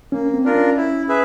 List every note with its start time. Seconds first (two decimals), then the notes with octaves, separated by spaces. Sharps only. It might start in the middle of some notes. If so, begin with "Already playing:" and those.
0.12 A#3 C#4
0.34 C4
0.44 D4 F4 A#4
0.55 C#4
0.77 E4
1.08 G#4 B4 E5